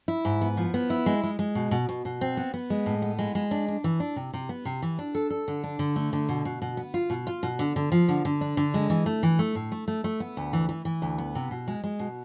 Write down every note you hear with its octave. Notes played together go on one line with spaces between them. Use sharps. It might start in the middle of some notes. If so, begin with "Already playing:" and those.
E4
G#2
B3
F3
B3
E4
G#3
G#3
G#3
B2
B2
B2
B2
C4
B3
B3
G#3
A2
B3
G#3
G#3
D4
D4
E3
D4
C3
C3
B3
C3
E3
D4
A4
A4
D3
D4
D3
A3
D3
B2
B2
B2
B3
F4
B2
F4
B2
D3
D3
F3
D3
D3
D4
D3
G#3
E3
A3
E3
A3
A2
A3
A3
A3
B3
D2
E3
E3
E3
D2
B3
C3
B2
G#3
G#3
B2